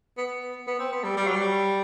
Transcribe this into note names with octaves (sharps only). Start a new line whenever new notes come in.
B3
B3
C4
B3
G3
G3
F#3
G3